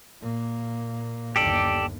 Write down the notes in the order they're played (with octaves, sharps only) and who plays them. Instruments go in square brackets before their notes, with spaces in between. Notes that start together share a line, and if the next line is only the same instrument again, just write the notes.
[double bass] A#2 A#3
[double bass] G1 D#2 [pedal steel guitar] G4 A4 D5